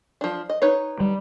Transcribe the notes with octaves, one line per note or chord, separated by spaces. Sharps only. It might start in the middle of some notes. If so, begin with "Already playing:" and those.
F3 D4
D#5
D#4 B4 C#5
G3